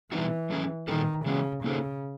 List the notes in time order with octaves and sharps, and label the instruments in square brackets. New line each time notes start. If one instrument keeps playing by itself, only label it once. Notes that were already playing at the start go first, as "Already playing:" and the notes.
[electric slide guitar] B2 G3 C4 D#4 F#4 [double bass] E3
[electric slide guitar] F#3 A3 C#4 E4 G#4
[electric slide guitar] A#2 G3 C4 E4 A4 [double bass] D#3
[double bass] C#3 [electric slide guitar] E3 G#3 C#4 F#4
[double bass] C#3 [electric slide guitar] A#3 D#4 F#4 A4 C5